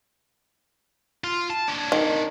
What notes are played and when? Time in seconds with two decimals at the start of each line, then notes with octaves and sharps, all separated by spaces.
1.24 F4
1.50 A5
1.68 D4 C#5
1.92 D#3